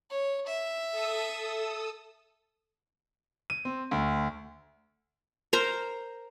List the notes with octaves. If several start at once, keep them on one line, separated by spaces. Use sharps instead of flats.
C#5
E5
A4 D#6 E6
D#7
C4
D2
A#4 C5 A#5